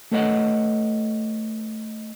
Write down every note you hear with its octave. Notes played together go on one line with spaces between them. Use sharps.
A3 A4 B4 C#5 D#5 F#5